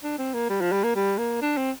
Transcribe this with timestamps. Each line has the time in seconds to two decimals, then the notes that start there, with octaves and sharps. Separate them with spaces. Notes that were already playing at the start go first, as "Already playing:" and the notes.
0.03 D4
0.18 C4
0.34 A#3
0.50 G3
0.61 F3
0.72 G3
0.84 A#3
0.96 G3
1.19 A#3
1.42 D4
1.57 C4